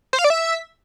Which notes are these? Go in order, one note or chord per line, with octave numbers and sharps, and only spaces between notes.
C5
F5
D5
E5